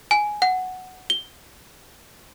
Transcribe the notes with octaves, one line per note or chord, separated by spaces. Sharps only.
G#5
F#5
G7